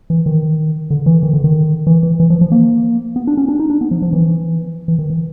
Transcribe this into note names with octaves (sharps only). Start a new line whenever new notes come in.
E3
D#3
D3
E3
D#3
D3
D#3
E3
E3
E3
F3
F3
A#3
B3
D4
C#4
D4
D#4
D4
B3
F3
F3
E3
E3
D#3
E3